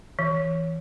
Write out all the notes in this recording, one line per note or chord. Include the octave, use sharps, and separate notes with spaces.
E3